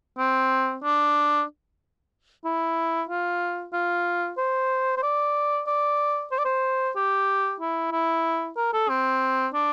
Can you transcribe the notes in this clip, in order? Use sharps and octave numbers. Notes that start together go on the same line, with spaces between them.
C4
D4
E4
F4
F4
C5
C5
D5
D5
C5
D5
C5
G4
E4
E4
A#4
A4
C4
D4